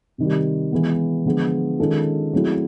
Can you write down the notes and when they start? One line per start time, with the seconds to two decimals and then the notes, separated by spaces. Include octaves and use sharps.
0.18 C3 D#3 G3
0.72 E3 G#3 B3
1.25 D3 F3 G#3 B3
1.80 D#3 G#3 C#4 F4 A4
2.33 F#3 A3 C4 E4 G#4